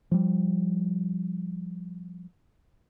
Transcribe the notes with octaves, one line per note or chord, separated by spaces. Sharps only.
F3 G3